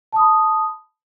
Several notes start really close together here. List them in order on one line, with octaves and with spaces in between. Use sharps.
A5 D#6 B5